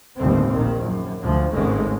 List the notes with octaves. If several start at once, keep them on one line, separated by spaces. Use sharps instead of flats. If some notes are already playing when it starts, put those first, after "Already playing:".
G1 D#2 A2 C4
A#1 D#3
F#2
D2 F3
G#1 G#2 G#3 A3 C#4